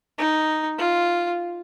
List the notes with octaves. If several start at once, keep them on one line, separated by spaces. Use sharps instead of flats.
D#4
F4